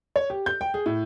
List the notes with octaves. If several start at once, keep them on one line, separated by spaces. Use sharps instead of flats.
C#5
G4
G6
G5
G#4
A2